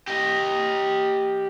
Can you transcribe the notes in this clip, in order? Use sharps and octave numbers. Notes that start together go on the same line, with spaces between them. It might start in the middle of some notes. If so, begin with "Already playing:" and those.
G4 D#5